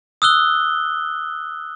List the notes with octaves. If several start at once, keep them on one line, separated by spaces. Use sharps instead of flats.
D#6 E6 F#6 G7